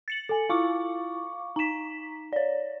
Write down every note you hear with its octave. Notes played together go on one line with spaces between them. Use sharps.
A6 C#7 F#7
A4 G#5
E4 F4 F5 C#6 D6
D#4 A#5 B6 E7
C#5 D5